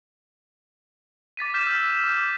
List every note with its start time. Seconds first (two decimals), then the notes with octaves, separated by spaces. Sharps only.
1.37 D6 A6 B6 D#7
1.54 F6 G6 B6 E7
1.67 E6
2.04 D6 G6